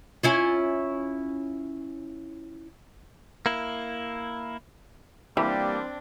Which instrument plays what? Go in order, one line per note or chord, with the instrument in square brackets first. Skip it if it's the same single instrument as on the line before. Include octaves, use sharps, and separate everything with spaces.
[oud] C#4 E4 F4
[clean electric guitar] A#3 E4
[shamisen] E3 [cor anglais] G3 [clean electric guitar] A#3 G4 [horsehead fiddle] C4 D4